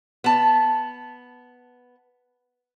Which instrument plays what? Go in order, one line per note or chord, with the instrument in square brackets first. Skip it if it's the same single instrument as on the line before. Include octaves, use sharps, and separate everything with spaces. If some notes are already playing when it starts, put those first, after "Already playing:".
[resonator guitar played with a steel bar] B3 A5